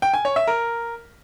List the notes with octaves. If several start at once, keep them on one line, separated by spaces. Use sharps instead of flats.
G5
G#5
C#5
E5
A#4